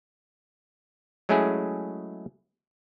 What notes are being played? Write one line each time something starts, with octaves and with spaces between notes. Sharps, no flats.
F#3 G#3 A3 C#4 E4 G#4